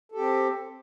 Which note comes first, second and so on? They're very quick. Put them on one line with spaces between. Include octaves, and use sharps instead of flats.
A4 G4 C4